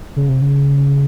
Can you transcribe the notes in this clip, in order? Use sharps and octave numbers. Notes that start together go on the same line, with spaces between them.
C#3
C3
C#3